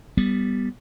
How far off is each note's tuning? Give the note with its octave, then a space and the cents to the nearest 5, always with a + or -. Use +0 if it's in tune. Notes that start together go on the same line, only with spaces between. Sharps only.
G3 +0 B3 +0